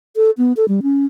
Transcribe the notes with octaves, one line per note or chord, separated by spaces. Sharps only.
A4
B3
A4
G3
C#4